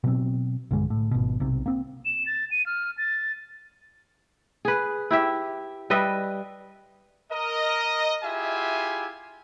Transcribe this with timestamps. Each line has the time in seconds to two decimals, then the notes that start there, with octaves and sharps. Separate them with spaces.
0.04 B2 F#3 C4
0.71 B1 G2 D3 G#3
0.90 A2
1.11 G#1 B2
1.40 B1 C3
1.66 A#3 C4
2.05 E7
2.26 A6
2.51 D#7
2.66 F6
2.98 A6
4.65 G#4 B4
5.11 E4 G4 E5
5.90 G3 B4 D#5 E5
7.31 A#4 D#5
8.23 E4 F4 G4 G#4 E5 G#5